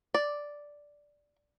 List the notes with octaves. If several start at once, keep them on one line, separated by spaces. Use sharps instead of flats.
D5